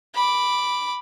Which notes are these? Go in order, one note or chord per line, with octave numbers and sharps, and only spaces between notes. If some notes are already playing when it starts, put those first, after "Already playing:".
B5 D6